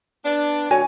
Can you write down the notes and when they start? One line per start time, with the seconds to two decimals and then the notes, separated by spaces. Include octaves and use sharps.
0.24 B3 D4
0.71 A2 D3 F#4 C#5 G#5